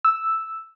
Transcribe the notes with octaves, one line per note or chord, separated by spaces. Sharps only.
E6